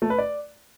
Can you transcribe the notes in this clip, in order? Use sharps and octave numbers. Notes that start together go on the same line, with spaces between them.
A3
B4
D5